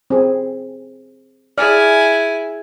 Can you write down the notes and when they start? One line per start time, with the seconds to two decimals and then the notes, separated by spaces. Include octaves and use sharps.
0.10 C4 G#4
1.58 E4 G#4 D5 G#5 F6